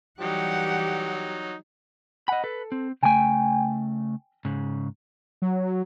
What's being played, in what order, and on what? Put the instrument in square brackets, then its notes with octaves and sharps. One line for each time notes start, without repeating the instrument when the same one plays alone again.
[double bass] E3 G3 [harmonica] F#3 D#4 [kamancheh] G4 [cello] F#5
[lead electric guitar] D#5 B5 [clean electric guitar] F#5
[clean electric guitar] A4 [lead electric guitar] B4
[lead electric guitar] C4
[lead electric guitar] C#3 A3 [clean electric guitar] G5 G#5
[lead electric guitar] G#2 C#3
[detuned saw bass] F#3